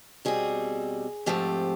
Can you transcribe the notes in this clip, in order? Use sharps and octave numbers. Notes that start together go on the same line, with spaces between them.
B2 G3 C4 G#4
G#2 F3 A3 C4 G4